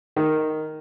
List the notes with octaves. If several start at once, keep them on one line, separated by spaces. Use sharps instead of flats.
D#3